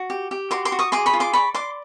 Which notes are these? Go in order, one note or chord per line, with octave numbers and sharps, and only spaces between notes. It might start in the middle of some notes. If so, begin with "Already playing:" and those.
Already playing: F#4
G4
G4
F#4 C6 D6
C6 D6
F#4
C#6 D#6
G#4 C6 D6
B5 C#6
F4
C6 D6
D5 B5 C#6
D5 C6 D6